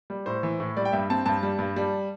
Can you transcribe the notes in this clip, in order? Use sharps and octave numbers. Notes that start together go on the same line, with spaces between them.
G3
A2 C5
E3
A2
G3 D5
G5
G2 E5
C4 A5
G2 A5
G3
G2
G3